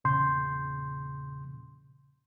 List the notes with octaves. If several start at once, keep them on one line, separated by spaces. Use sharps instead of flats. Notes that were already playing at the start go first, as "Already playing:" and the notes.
E2 A#2 C#3 C6 G6